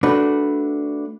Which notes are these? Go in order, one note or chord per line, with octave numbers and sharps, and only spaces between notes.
A3 D4 F#4 B4